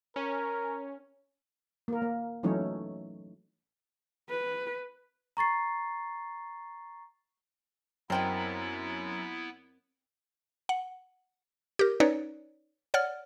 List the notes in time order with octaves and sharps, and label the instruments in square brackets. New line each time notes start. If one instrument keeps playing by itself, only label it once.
[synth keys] C#4 [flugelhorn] A#4
[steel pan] A#3 A#4
A#3
E3 F#3 A3 C#4 D#4 C#5
[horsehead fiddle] B4
[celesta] A#5 C#6 A6 C7
[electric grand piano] F#2 [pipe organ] B3 E4 [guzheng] C4 A#4 D#5 [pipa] C5 G5
[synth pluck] F#5
G4 A#4
C#4 D#4 B4 C#5 D5
C#5 D5 F#5 F6